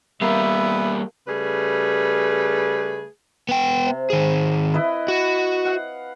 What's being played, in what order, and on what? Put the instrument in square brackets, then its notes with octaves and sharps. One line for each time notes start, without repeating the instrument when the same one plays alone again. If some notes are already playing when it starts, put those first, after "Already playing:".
[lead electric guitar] G3 A#3 [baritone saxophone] B3 [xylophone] A#4 F5 A#5 [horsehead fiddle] E5
[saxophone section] C#3 G3 A3 G#4 B4
[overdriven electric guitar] B3 G5
[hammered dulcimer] C3
[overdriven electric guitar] D#3 G#4
[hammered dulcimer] E4 B4 D#5
[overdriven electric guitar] F#4
[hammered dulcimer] F5 F#5